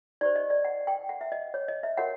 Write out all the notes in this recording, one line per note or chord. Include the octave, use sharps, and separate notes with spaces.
D#4 G4 C5 D5
D#5
D5
F#5
G5
F#5
E5
D#5
C#5
D#5
E5
F#4 A#4 C#5 F#5